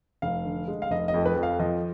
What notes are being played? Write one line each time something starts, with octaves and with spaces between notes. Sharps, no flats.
F1 F5
D3
G#3
F5
F1 D#5
D#5
F2
B4
F2
F5
F3 D#5